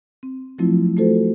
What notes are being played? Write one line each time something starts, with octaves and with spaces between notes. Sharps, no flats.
C4
F3 F#3 A3 C4 E4 F4
A3 F4 F#4 A4 C5